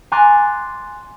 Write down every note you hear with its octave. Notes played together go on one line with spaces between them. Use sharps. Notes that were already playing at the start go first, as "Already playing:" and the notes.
G#5 A#5 C6 D6 F#6 A6